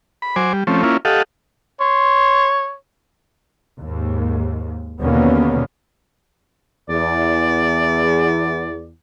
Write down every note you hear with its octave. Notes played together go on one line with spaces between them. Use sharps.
B5
F#3 C5 G#5 D6
G3
F3 A3 C4 C#4
A#3 C#4 E4 F4
G4 A4 D#5 F5 F#5
C#5 C6
D#2 G#2
D#2 B2 D3 A#3 B3 C#4
E2 D5